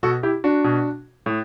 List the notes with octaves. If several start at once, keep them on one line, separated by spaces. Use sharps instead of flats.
B2 F#4 A4
E4 G4
D4 F#4
B2
A2